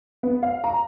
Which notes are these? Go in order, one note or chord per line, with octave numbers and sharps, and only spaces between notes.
B3
F5
A#5